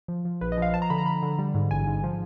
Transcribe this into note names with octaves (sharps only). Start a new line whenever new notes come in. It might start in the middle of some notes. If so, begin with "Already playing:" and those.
F3
F3
A#1 B4
D#5
F3 F5
F3 A5
A#5
D3 B5
A#5
D3 B5
D3
G3
G#2
A1 G#5
G#2
F3